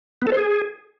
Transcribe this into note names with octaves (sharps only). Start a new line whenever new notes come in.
B3
A4
C5
G#4